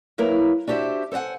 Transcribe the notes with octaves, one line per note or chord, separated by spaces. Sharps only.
F#3 A#3 E4 A#4 B4
D4 F#4 G4 C5 E5
A4 C5 D5 F#5 G#5